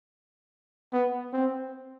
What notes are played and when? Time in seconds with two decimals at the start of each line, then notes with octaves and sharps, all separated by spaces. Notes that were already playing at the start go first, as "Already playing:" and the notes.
0.93 B3
1.33 C4